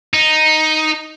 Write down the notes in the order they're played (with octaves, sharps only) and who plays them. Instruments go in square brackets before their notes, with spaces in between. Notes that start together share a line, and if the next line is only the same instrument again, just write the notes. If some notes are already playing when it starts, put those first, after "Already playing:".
[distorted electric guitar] D#4